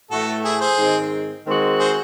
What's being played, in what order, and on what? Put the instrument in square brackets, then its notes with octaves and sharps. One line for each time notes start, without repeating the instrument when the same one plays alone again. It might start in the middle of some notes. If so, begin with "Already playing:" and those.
[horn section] A2 E3 A3 [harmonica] F#4 A4
[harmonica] E4 G#4
G#4 C5
[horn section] G#2 D#3 G#3 C4
D#3 G#3 C4 F#4
[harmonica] G#4 C5